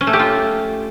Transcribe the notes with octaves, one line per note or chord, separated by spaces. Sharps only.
C#4
A3
G4
F4